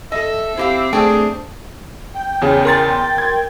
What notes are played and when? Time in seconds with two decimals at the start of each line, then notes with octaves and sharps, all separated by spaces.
0.12 A4 D#5 E5
0.57 C4 E4 G4 F5
0.93 A3 D4 G#4 G5
2.15 G5
2.42 E2 C#3
2.65 A#4 C6 A6
3.18 G#6